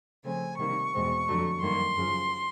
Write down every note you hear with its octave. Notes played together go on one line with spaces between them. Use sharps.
C#3 F3 A3 C4 G#5
C3 D#3 G3 A#3 C#6
E2 B2 G#3 C4
F2 D3 F#3 A3
F#2 D#3 G3 A#3 C6
F#2 C#3 F3